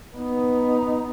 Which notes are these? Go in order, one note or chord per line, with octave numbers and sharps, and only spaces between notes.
B3 D#4